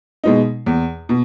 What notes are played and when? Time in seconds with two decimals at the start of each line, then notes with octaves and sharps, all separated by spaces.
0.24 B2 G#3 D#4
0.66 E2
1.09 B2